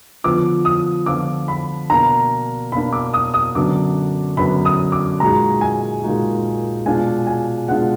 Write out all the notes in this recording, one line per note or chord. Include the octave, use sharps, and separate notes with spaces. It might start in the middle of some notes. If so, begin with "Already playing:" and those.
D3 F3 B3 F4 D6
D#6
D3 F3 B3 F4 D6
B5
B2 A#3 D4 A#5
B2 A#3 D4 B5
D6
D#6
D#6
F#2 D3 F#3 B3 D4 D6
F#2 D3 F#3 B3 D4 B5
D#6
D6
A#2 G#3 D#4 F#4 A#5
G#5
A#2 G#3 D#4 F#4
B2 G#3 D4 F4 G#5
G#5
B2 G#3 D4 F4 F#5